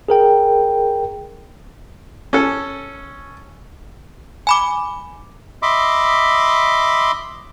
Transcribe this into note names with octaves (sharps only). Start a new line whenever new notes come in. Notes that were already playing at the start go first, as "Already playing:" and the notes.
G#4 A#4 G5
C#4 A4
G#5 B5 D6
D#5 E5 B5 C6 D6